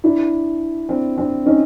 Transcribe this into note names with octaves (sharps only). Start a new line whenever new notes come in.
D4 E4
C4 D4
C4 D4
C#4 D#4